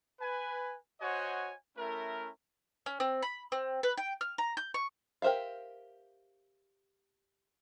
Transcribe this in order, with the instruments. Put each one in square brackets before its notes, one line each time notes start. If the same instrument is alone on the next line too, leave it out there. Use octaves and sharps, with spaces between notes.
[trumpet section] B4 G#5
F#4 C5 C#5 D#5 F#5 G#5
A3 C#4 E4 A#4
[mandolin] C#4
C4
B5
C4
B4
G5
F6
A#5
G6
C#6
[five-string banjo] G4 A#4 C5 E5 F5